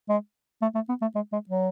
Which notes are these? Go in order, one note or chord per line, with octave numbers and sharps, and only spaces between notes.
G#3
A3
A3
B3
A3
G#3
G#3
F#3